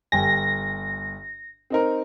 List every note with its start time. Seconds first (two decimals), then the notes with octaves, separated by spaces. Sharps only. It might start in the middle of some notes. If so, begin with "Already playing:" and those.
0.12 G1 G5 G#5 A#6
1.70 C4 D#4 A#4